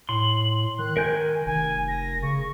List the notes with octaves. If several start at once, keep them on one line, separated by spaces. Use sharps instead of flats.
A2 C6 F#7
D#3 F#6
A#4 G#5 G6
F1 G#5
A#6
C#3 C#6